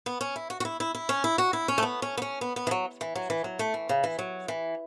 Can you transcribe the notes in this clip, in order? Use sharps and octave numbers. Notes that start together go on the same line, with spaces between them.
B3
C#4
E4
F#4
F#4
E4
E4
E4
C#4
E4
F#4
E4
C#4
A3
B3
C#4
B3
C#4
B3
B3
E3
F#3
E3
F#3
E3
F#3
A3
E3
C#3
E3
F#3
E3